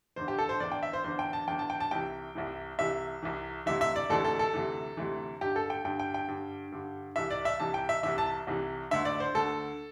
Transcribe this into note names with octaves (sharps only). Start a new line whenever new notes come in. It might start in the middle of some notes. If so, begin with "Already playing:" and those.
E2 D3 C5
G4
A4
C5
E2 D3 D5
G5
E5
C5
E2 D3 C5
G5
A5
E2 D3 G5
A5
G5
A5
C2 C3 E3 G5
C2 C3 E3
C2 C3 E3 E5
C2 C3 E3
D2 C3 E3 E5
E5
D5
D2 C3 E3 A4
A4
A4
D2 C3 E3
D2 C3 E3
G2 D3 G4
A4
G5
G2 D3 G5
G5
G5
G2 D3
G2 D3
C2 C3 E3 E5
D5
E5
C2 C3 E3 A5
G5
E5
C2 C3 E3 E5
A5
C2 C3 E3
D2 D3 E5
D5
C5
D2 D3 A4